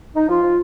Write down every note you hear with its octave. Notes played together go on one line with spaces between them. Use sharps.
D#4
F3 F4
F3